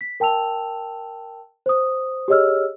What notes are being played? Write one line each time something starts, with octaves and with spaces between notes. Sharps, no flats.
B6
A#4 G5 A5 E6 F7
C5 D#6
G4 G#4 C#5 D#5 E6 F6